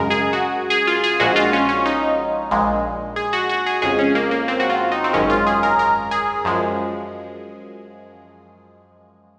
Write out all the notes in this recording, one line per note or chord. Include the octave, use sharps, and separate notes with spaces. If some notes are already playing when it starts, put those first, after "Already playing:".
Already playing: F#2 C#3 G#3 A#4
G#4
F#4
G#4
F4
G#4
A#1 A#2 F3 G#3 F#4
F4
C#4
C#4
D#4
A#1 A#2 G#3
G#4
F#4
F#4
G#4
F2 C#3 G#3 G#4
C#4
A#3
A#3
C4
F#4
F4
D#4
C4
G#1 F#2 D#3 G#3 C#4
F4
G#4
A#4
A#4
G#4
F#2 F3 G#3